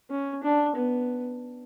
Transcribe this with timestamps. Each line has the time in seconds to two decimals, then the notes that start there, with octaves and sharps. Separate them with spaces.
0.10 C#4
0.43 D4
0.76 B3